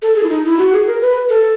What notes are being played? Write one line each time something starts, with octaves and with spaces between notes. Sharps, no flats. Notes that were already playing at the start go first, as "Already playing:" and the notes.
A4
G#4
E4
D#4
E4
F#4
G#4
A#4
B4
A4